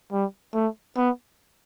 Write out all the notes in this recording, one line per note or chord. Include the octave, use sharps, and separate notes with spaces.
G3
A3
B3